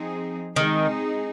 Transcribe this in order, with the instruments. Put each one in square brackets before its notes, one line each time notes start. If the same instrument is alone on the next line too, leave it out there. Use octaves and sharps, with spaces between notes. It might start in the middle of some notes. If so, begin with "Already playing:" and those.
Already playing: [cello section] F3 C4 D#4 G#4
[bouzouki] D#3 [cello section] G#3 C4 D#4 G#4